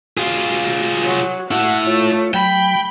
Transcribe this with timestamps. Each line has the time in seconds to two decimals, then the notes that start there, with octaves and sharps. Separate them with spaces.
0.17 F4 F#4 G#4
1.02 F#3
1.51 E4 A4 F#5
1.87 A3 F4 C#5
2.34 F#3 G5 B5